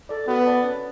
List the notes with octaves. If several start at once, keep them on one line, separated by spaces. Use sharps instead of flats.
A4 D5
B3 F#4
B4 D5 A5
C#4